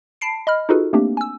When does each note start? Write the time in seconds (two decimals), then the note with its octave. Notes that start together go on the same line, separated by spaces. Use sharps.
0.21 A5 B5 C7 D7
0.47 D#5 B5 F6
0.69 D#4 F4 F#4 G#4 A4 B4
0.93 A3 A#3 C4 D4 G4
1.17 G#5 E6